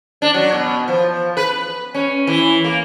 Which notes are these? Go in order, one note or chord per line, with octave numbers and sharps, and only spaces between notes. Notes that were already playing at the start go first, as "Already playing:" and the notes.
D4
F#3
B2
F3
B4
C#4
E3
A#3